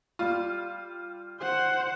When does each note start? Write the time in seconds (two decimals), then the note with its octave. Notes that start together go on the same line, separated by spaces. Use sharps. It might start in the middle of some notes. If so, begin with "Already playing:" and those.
0.19 G3 F4
1.41 C5 F#5